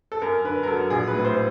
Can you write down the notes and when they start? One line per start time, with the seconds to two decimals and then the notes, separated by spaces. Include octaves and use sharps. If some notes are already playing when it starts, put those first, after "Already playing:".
0.12 A4
0.22 F#2 A#4
0.44 D3 B4
0.63 A#4
0.67 F#3 A4
0.90 A#1 G#4
1.07 B4
1.13 A2
1.25 C5